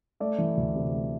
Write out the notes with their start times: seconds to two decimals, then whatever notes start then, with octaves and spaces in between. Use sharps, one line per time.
0.20 A3 D5
0.38 E3
0.57 D2
0.75 C3
0.93 A3